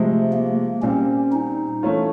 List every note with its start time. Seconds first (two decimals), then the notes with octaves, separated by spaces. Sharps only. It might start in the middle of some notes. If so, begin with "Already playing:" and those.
Already playing: C3 F3 G#3 A3
0.33 A#3
0.82 A#2 G3 C4 C#4
1.33 D#4
1.83 E3 A3 C#4 F4